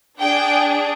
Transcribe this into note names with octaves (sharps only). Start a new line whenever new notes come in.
D4 G#4 G5